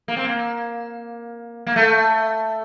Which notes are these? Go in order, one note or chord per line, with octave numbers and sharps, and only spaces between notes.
A#3
C4
A#3
A#3
A3